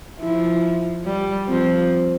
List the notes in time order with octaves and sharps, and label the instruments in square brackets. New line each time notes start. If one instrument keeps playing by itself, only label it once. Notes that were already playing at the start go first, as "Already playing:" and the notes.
[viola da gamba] F3 [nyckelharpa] E4
[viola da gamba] G3
[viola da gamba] F3 [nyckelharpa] C4